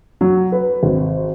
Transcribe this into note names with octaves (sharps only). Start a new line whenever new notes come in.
F#3
B4
G#1